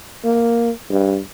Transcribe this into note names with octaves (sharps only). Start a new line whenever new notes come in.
A#3
G2